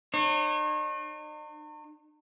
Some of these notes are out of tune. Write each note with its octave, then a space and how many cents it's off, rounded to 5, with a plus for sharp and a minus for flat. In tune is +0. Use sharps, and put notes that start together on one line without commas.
D#4 -45 C#5 -35